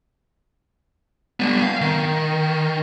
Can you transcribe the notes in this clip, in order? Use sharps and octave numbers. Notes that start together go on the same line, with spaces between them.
G3 B3
F5
D#3